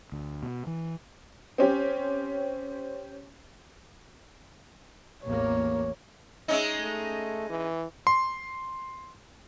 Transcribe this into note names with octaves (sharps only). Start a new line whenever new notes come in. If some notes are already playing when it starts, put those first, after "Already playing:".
D2
B2
E3
C4 C#4 G4
A1 E2 A#3 C#5
G#3 C#4 D#4 D#5 E5 E6
A3
E3
C6